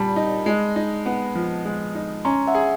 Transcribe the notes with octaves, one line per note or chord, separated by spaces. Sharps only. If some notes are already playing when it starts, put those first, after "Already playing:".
Already playing: A#2 G3 A5 B5
D#4
G#3
D#4
B3
F3
G#3
D#4
C#4 A#5 C6
E5 F#5
G#4